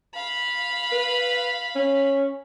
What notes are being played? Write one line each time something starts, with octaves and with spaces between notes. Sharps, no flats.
F5 B5
B4
C#4